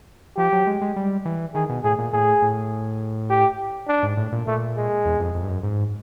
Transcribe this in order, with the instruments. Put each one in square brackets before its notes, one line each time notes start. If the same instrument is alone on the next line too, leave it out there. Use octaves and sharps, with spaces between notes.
[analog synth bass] F3 [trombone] G4
[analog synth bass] F#3
G#3
G#3
G3
E3
[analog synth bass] D#3 [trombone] G#4
[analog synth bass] B2
[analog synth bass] A2 [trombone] G#4
[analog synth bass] A#2
[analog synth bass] A2 [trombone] G#4
[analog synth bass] A2
[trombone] G4
D4
[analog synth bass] G#2
A2
A#2
[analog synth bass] A#2 [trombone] A3
[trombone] G#3
[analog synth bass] E2
F2
F2
G2
F#2
G#2